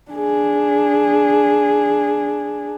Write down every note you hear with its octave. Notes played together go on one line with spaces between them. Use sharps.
D4 G#4